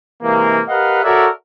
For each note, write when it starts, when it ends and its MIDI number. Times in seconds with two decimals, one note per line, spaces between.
0.23 0.61 48
0.23 0.61 52
0.23 0.61 56
0.23 0.61 58
0.69 1.02 67
0.69 1.02 70
0.69 1.02 71
0.69 1.02 75
0.69 1.02 77
0.69 1.02 78
1.04 1.27 66
1.04 1.27 69
1.04 1.27 70
1.04 1.27 73
1.04 1.27 74
1.04 1.27 76